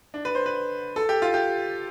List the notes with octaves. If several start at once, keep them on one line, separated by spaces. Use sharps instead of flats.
D4
B4
C5
B4
A4
G4
F4
G4